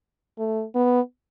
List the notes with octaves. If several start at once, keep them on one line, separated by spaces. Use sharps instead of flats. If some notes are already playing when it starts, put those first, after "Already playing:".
A3
B3